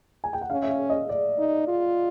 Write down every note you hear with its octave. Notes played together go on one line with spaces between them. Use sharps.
G#5
G5
F#5
C#4 F5
E5
F5
D#5
D5
D#4
F4